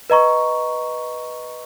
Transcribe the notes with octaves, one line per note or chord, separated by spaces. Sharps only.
B4 D#5 A#5 C#6